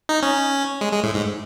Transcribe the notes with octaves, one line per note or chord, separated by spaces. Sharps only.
D#4
C#4
G#3
G#3
A2
G#2